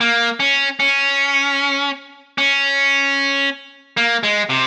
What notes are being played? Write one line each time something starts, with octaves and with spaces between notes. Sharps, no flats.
A#3
C#4
C#4
C#4
A#3
G#3
C3